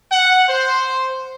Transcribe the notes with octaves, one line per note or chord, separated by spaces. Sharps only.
F#5
C5